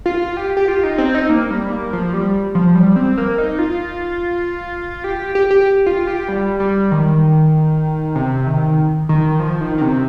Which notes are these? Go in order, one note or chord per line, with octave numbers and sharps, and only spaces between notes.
F4
G4
G4
F4
D#4
C4
D#4
A#3
G3
A#3
F3
G3
F3
G3
C4
A#3
D#4
F4
G4
G4
G4
F4
G4
G3
G3
D#3
C3
D#3
D#3
F3
D#3
D#3
C3